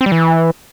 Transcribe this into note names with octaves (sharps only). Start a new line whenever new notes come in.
C4
G3
E3